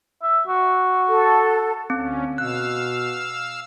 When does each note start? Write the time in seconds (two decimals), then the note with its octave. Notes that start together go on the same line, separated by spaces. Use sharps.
0.23 E5
0.48 F#4
1.09 A4
1.90 D2 C4 C#4
2.38 B2 F5 E6 F#6